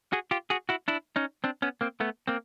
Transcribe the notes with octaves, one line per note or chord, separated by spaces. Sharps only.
F#4 G#4
F4 G4
F#4 G#4
E4 F#4
D4 E4
C#4 D#4
C4 D4
B3 C#4
A#3 C4
A3 B3
A#3 C4